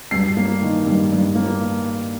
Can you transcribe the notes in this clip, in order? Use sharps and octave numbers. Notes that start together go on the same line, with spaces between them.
G2 C7
A#3
D#3
G2
G2
A#3